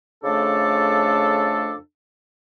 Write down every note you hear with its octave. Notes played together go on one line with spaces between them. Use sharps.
F2 C#3 A3 D4 A4 D6